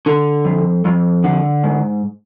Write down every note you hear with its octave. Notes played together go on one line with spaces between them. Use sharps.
D3
F2
F2
D3
G#2